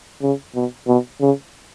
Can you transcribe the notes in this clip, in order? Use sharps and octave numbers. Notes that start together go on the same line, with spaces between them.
C#3
B2
B2
C#3